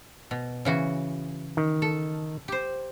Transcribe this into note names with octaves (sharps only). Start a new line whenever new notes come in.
B2
C#3 E3 F#4
D#3
A4
G4 C5